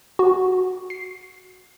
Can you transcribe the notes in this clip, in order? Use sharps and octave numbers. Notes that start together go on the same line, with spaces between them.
F#4
C7